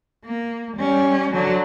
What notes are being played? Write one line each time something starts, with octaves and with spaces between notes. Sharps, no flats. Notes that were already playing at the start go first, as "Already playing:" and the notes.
A#3
G3 C#4
D3 F#3